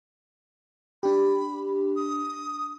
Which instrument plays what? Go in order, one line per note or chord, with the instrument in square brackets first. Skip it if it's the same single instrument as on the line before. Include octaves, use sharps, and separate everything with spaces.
[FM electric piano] D4 G4 [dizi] B5
[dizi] D#6